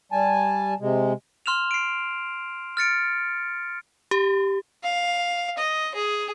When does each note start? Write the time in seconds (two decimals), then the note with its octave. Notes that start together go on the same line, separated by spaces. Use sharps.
0.12 G3 G#5 A5
0.80 C3 G#3
1.46 C6 F6 E7 F7
1.71 C7 D7
2.77 F6 A6 C#7 D7
4.11 G4
4.83 F5
5.58 D#5
5.95 G#4